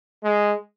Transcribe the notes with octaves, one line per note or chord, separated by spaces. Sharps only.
G#3